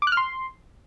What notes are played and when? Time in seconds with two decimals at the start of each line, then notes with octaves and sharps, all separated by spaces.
0.02 D6
0.07 F#6
0.12 F6
0.17 C6